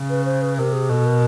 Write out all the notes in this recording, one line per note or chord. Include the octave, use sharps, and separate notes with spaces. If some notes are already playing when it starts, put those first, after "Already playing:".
Already playing: C#3
B4
C5
B4
C3 A#4
G#4
B2 A4
A#4